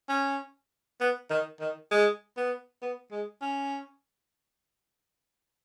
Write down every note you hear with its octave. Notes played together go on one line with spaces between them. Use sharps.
C#4
B3
D#3
D#3
G#3
B3
B3
G#3
C#4